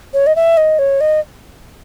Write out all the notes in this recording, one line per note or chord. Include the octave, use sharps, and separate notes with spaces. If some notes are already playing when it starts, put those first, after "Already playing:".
C#5
D#5
E5
D#5
C#5
D#5